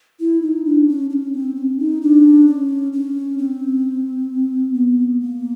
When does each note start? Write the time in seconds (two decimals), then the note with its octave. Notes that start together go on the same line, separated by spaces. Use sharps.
0.20 E4
0.42 D#4
0.65 D4
0.88 C#4
1.10 D4
1.13 C#4
1.32 C4
1.55 C#4
1.78 D#4
2.01 D4
2.47 C#4
2.93 C#4
3.38 C4
4.74 B3
5.20 A#3